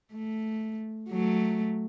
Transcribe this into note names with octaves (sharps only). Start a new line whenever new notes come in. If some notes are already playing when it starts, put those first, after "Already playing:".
A3
F#3 A3